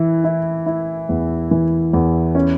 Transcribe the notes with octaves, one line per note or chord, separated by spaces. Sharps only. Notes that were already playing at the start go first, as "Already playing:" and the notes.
Already playing: E3 E4
E4
E4
E2
E3
E2
C#4